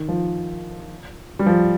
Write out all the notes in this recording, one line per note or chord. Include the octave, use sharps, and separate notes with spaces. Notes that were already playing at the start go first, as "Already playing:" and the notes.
Already playing: D#3
F3
G3
F3